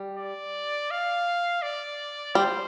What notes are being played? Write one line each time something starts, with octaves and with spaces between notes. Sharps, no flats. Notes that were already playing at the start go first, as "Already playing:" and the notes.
Already playing: G3
D5
F5
D5
G3 C5